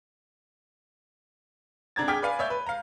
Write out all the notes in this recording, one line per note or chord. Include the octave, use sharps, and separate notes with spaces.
C3 D4 A#5 G#6 A6
G#4 G5 D6 F6 G#6 B6
B4 D5 F5 G#5
C#5 D5 E5 E6 G6
B4
F5 A#5